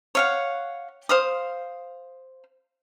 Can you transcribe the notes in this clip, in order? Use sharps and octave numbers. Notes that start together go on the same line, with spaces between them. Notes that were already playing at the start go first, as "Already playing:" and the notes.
C#5 F5 F#5
C5 F5 D#6